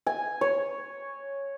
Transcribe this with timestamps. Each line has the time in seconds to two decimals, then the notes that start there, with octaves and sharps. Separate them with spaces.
0.07 G#5
0.41 C#5